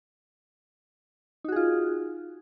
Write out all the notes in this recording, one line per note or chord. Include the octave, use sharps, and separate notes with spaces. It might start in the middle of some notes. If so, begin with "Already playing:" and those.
D#4 F4 F#4 G#4